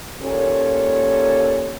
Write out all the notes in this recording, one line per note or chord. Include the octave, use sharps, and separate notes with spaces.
D#2 A#2 C#4 A4